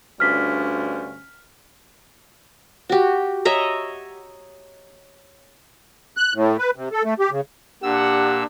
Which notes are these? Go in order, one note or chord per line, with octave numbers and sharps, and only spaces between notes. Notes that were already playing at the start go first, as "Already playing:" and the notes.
D2 G2 C#4 F6 B6
F#4 G4
C#5 D#5 E5 A#5
F#6
A2
B4
C3
A4
A3
G4
C#3
A#2 D4 G4 F#5 E6